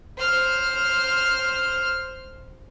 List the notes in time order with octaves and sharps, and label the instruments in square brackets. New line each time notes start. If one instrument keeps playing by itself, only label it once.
[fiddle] C5 F6